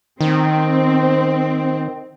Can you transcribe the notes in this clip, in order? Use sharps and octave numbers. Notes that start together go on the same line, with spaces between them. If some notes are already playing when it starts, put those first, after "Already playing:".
D#3 C4